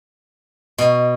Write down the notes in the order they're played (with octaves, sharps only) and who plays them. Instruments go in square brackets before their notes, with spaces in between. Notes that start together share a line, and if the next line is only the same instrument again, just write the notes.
[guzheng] B2